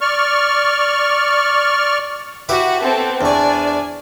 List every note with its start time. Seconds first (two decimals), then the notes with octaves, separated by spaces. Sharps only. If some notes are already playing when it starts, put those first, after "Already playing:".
0.01 D5 C#6 F6
2.49 E4 F#4 G4 B4
2.81 B3 C4 A4
3.21 E2 D4 D5 G#5 C#6